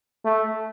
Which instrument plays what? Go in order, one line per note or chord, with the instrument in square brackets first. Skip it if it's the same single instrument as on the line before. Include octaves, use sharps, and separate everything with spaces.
[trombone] A3